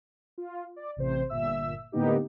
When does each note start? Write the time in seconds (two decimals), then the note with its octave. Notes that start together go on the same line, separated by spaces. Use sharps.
0.38 F4
0.76 D5
0.96 A1 C3 C5
1.29 G1 A#2 E5 E6
1.92 A2 D3 A#3 B3 D#4 G4